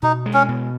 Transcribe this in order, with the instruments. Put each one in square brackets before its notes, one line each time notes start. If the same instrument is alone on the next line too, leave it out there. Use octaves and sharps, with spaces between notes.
[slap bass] B2 [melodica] D#4
[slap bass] G#3
[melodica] C#4
[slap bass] B2